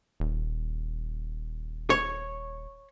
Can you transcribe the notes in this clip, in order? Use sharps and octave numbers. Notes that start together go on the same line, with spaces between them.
D#1
C#5